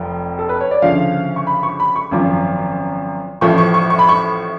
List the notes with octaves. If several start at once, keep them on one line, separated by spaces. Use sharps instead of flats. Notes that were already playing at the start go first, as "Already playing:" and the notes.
Already playing: F1 F2 F3
A4
B4
C#5
D5
D2 C#3 F3 F5
C#6
B5
C#6
B5
C#6
G#1 F#2 F3 D6
A1 A2 F3 C#6
C#6
C#6
C#6
B5
C#6